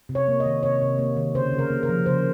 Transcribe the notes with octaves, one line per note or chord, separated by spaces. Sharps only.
C3
C#5
A#3
D#5
D#3
C3 C#5
C3
A#3
D#3
C#3 C5
C#3
A#4
A#3
A#4
F3
C#3 C5